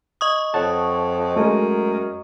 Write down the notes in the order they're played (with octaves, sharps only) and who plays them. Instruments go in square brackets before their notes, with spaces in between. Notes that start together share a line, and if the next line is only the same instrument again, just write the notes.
[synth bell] D#5 C#6 D#6
[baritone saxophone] F2 [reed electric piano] C#5 F#5 A5
[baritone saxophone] F#2 [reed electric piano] G#3 A3